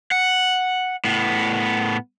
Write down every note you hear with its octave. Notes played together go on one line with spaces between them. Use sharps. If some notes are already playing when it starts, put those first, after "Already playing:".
F#5
A2 B3